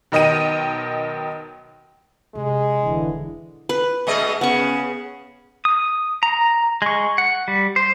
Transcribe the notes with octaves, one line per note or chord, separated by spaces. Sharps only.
B1 D#3 D#5 G5 D#7
C3 G#3 D4
E1 F2 D3 E3
B4
B2 G#3 D#5
C#3 B3 C#6
D#6
A#5
G#3 C#6
F#5
G3
C5